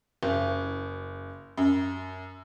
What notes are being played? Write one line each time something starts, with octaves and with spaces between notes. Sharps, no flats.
F#1
F#2